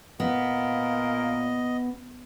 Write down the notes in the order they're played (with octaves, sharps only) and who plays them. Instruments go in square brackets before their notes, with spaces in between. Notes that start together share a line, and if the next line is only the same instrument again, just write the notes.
[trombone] A#2 [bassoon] A#3 [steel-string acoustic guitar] B3 [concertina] D#5